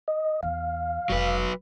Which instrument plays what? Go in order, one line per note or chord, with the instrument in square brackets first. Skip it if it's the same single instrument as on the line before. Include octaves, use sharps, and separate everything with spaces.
[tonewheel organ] D#5
[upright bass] E2 [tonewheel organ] F5
[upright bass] F1 G#3 [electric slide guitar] F#3 B4